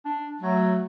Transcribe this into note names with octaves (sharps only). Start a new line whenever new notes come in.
D4
F#3 A3